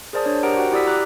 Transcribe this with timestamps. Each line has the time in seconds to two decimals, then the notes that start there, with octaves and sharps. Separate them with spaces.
0.13 G#4 A#4 C5 D5 A5 D#6
0.25 D4 C#5 D5
0.43 G4 A#4 C5 F#5 A#5 D7
0.57 F#4 F#5 G5
0.72 E4 G4 D5 D#6 E6 B6
0.87 A#5 D6 F#6